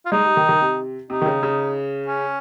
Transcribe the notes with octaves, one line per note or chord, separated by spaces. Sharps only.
F4
G#3 D#4
G3
D#3
D#3
C3
C3 D#4
D#3
C#3
C#3
C#4